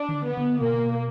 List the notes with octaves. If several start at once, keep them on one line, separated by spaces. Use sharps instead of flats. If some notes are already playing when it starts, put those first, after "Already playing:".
Already playing: D4
D#3
D3
B3
D3
B2 A#3